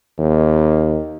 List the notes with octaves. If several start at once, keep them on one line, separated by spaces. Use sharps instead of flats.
D#2